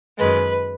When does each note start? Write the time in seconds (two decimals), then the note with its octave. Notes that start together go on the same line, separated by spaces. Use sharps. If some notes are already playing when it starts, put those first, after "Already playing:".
0.18 F#2 D#3 G#3 B4